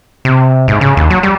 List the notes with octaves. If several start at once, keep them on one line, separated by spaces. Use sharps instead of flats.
C3
G#2
C#3
D#2
F#3
G3